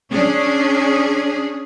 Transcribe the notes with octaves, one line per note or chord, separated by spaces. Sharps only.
C#4 D4 G#4